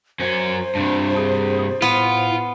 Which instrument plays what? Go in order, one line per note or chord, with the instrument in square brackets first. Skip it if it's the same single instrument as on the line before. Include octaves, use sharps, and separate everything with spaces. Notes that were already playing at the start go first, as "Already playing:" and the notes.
[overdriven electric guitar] F#2 C#4 [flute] C5
[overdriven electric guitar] G2 C3 [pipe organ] D4
[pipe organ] G#4
[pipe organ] A2 [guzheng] B3 [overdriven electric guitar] F4